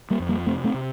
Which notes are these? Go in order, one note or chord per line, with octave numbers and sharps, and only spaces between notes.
G3 A#3
F2
G3 A#3
C3 A3 C4
A3 C4
C3